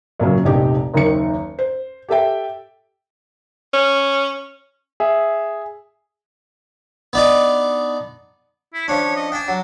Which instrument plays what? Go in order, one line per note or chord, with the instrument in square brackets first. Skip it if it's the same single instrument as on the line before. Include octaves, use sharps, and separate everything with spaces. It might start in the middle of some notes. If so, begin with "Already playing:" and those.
[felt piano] F#2 A#2 C#3 F#3
F1 A#1 D#4 G4
F#1 D#2 D#3 C#7
C5
G4 A4 E5 G5
[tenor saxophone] C#4
[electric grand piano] G#4 E5
[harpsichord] B3 D4 D#4
[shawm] E4
[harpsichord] F3 C#4 D4 [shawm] C#5
[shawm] D#5
[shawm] D4 [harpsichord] G5 G#5
[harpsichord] F#3